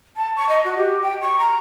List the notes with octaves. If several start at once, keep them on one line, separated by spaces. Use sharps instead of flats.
A5
C#6
D#5
F#4
G4
G5
C#6
A#5